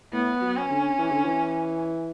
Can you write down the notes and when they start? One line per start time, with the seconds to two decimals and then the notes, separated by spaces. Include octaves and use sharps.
0.12 A2 B3
0.41 F#3
0.56 C#4
0.70 D3
0.98 E3
1.11 D3
1.25 E3